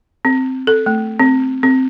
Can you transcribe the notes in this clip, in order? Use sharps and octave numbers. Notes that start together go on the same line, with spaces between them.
C4
A4
A3
C4
C4